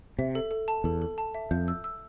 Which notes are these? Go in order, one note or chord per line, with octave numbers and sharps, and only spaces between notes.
C3 E5
A4
A4
A5
E2 A4
A4
A5
E5
F2 G6
E6
E6